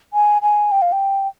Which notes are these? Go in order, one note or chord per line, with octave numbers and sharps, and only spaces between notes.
G#5
G#5
G5
F5
G5